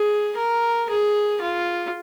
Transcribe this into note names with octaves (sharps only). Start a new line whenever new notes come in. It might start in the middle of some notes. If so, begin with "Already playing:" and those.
Already playing: G#4
A#4
G#4
F4